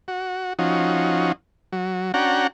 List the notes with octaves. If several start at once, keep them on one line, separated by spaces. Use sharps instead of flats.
F#4
F3 C#4 D#4 F#4
F#3
C#4 D4 F#4 F#5 G5 A#5